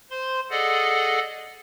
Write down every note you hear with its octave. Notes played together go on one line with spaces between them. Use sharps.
C5 C6
G#4 A4 D5 D#5 F#5